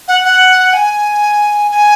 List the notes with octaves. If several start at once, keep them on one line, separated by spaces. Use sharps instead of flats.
F#5
F#5
G#5
G#5